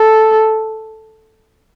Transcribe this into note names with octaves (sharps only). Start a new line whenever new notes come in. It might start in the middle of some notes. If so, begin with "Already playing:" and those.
Already playing: A4